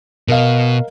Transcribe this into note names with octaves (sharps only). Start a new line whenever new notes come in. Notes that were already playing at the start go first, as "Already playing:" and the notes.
B2 A#4 D#5 F5